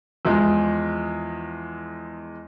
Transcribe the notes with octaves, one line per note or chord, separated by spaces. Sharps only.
E2 F3 G#3